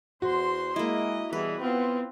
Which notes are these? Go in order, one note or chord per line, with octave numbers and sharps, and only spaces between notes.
E2 F#4 C5 C6
G#3 A#3 E4 D#5
B2 E3 G3 G#4 B4
B3 C4 F4